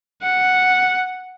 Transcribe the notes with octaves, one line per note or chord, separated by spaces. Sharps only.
F#5